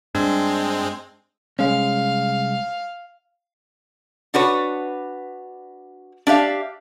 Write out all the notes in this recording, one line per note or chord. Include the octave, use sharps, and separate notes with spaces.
G2 G3 G#3 C4 D4
C2 G#3 C#4 F5
D4 F#4 B4 C#5
D4 G4 E5 F5